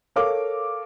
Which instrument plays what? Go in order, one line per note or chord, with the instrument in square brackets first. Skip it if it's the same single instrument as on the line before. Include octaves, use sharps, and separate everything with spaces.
[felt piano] A4 A#4 C#5 F5 D6